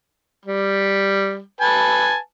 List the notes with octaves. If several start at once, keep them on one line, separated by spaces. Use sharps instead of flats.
G3
B4 G#5 A5